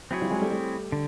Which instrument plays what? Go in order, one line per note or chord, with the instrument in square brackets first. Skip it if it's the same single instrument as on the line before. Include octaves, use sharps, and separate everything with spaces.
[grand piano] F#3 [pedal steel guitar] C4 E4 G#4 C#5
[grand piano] F3 G3
F#3 G#3
G3 A3
G3 A3
[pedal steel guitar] D3